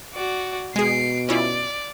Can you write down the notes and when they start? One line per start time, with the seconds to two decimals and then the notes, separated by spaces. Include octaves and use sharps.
0.14 F#4 D5
0.76 B2 G#3 G#4 C7 D7
1.29 C#4 E4 F4 D5